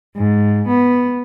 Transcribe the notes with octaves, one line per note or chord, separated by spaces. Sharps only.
G#2
B3